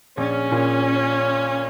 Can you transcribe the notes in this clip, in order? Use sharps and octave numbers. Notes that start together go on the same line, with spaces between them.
A#1 C#4
A#2